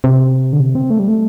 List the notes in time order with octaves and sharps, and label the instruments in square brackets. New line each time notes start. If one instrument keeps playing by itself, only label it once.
[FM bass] C3
D3
C3
C4
A3
G3
A3